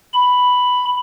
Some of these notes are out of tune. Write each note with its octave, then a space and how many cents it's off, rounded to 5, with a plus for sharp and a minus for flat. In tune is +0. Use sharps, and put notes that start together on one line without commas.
B5 +5